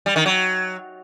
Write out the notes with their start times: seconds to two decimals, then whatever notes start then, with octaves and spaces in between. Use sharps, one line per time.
0.06 G3
0.16 D#3
0.26 F#3